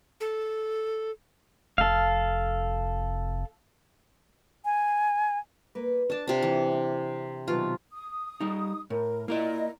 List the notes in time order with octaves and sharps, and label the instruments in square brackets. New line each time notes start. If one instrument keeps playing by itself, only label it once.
[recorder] A4
[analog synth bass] F1 [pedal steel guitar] A4 F5
[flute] G#5
[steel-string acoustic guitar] A#3 B4
[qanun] D4 A5 [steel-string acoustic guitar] C#5 D5
[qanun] C3 D4 [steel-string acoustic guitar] F4
[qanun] E3
[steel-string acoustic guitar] C4
[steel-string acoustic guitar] B2 D#3 F#3 [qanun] F4
[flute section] D#6
[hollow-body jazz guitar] G3 D#4
[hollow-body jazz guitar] A2 [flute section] A#4
[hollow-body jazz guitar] A#3 A#4 D5 [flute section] E4 D#5